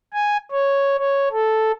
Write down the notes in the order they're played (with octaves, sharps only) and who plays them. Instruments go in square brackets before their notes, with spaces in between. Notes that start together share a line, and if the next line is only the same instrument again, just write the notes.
[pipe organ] G#5
C#5
C#5
A4